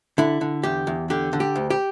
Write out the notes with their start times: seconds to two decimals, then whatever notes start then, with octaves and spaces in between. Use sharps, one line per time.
0.18 D3 E4
0.41 D3
0.63 E2 G4
0.87 E2
1.10 D3 G4
1.33 D3
1.40 G4
1.56 D2
1.70 G4